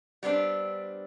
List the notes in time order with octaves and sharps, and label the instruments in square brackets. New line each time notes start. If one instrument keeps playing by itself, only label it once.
[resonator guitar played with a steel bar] G3 B3 C4 D4